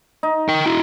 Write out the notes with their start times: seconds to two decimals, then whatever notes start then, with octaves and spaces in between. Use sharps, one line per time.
0.23 D#4
0.48 A#4 G5
0.66 E4 F#4